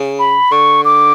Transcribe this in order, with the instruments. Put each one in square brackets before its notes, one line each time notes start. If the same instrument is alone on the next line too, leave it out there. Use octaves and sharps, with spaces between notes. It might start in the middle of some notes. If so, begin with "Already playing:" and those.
Already playing: [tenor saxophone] C#3
[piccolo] B5
[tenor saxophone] D3 [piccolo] C#6
[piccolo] D6